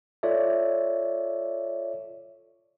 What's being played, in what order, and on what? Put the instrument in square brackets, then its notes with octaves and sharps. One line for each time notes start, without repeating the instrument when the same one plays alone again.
[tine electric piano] F4 A4 C#5 D5 E5